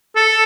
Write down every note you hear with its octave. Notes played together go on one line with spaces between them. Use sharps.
A4